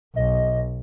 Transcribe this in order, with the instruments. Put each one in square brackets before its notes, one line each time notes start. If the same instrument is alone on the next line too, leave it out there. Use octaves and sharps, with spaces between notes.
[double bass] B1 [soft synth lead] D#5